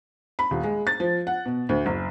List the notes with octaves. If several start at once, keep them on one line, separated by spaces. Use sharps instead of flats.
B5
D#1
G#3
A6
F3
F#5
B2
D2
F#1